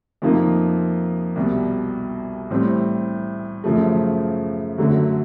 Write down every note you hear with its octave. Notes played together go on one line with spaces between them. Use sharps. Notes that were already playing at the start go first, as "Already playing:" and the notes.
F2 C3 F3 A#3 D#4
C2 B2 G3
A2 E3 G3 C4
F#2 C#3 F3 A3
F#2 D3 F#3 A3